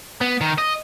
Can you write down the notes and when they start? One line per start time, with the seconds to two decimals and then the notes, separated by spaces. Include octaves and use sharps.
0.21 B3
0.41 D#3
0.58 D#5